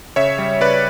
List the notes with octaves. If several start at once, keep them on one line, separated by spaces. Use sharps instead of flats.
C#3 C#5 E5
G3
C#3 B4 D5